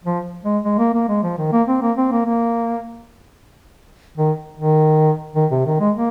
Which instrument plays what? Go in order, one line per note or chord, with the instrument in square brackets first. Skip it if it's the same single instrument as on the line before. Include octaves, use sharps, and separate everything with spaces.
[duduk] F3
G#3
G#3
A#3
A#3
G#3
F3
D#3
A#3
C4
A#3
C4
A#3
A#3
D#3
D#3
D#3
C3
D#3
G#3
A#3